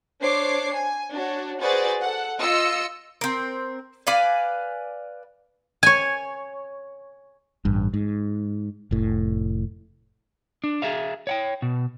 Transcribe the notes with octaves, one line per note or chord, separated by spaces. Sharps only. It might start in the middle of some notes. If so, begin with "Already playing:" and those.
D4 C5 C#5 D6 C7
G#5
D4 F#4 C#5
F#4 G#4 B4 C5 D5 A6
A4 F#5
F4 D#5 E6 C#7
C4 A#4
B4 D5 F5 G#5
C#5 G#5
A1 G2
G#2
F1 A2
D4
G#4 E5 F5
C#5 F#5 G5
B2